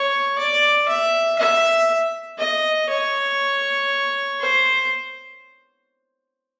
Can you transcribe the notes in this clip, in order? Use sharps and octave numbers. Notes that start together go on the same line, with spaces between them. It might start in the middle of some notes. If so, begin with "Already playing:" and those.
Already playing: C#5
D5
E5
E5
D#5
C#5
C5